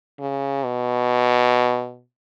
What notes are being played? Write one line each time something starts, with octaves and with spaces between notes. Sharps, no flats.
C#3
B2